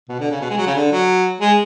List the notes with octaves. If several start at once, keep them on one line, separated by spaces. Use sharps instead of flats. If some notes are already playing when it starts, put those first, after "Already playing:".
B2
D3
C#3
B2
G#3
F#3
C#3
D3
F#3
G#3